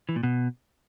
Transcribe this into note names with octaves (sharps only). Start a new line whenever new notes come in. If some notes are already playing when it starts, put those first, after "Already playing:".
E3
A#2
B2